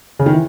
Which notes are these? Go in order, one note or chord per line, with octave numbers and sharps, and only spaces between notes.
C#3
D#3
E3